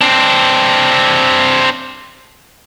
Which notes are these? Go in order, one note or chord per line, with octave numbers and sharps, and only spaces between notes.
C4 D4